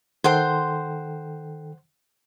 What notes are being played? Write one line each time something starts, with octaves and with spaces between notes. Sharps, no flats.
D#3 A4 C5 F#5 G5 C6